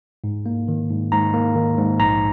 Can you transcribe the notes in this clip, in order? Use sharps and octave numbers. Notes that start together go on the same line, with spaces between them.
G#2
A#3
D#3
G#2
G#2 A#5
A#3
D#3
G#2
A#1 A#5